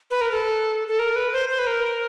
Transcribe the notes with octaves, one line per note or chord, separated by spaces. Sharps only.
B4
A#4
A4
A4
A#4
B4
C5
C5
B4
A#4